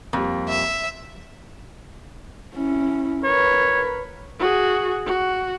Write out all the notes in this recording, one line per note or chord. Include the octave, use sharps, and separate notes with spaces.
F2 G3 A#3
E5
C#4 E4
A#4 B4 C#5
F#4 G#4
F#4